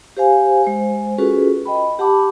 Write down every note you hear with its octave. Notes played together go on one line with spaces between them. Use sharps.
G4 C5 F5 G#5
G#3 C5
C#4 F4 F#4 G#4 A4 B4
D#5 G5 B5
G4 F#5 A5 B5 D6